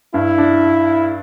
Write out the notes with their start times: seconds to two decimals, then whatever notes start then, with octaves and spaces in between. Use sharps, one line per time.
0.14 G2 E4
0.38 D4